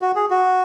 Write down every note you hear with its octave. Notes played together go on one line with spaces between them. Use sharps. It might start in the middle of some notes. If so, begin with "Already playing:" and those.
F#4
G#4
F#4